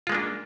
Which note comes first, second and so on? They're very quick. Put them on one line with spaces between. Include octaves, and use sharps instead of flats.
F4 G#3 A#3 D4